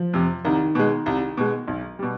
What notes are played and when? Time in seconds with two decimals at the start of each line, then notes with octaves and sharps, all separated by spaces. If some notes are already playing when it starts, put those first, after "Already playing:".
Already playing: F3
0.13 F2 C3
0.45 C2 D#3
0.75 B2 G#3
1.06 C2
1.37 B2 G#3
1.68 B1
1.99 B2 G3